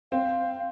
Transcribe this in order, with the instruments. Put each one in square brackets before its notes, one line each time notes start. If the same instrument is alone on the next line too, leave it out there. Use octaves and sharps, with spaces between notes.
[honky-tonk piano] C4 [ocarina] F5